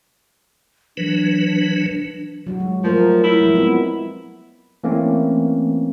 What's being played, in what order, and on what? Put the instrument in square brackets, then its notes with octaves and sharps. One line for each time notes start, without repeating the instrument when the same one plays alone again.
[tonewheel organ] E3 F#3 B4 [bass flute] D4
[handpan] F#3 F#4
G#3
[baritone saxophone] F3 [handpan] F#3 A3 A#4
[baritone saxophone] E4
[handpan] F3 G#3
B3 C4 F4
[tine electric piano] E3 A3 A#3 C4 C#4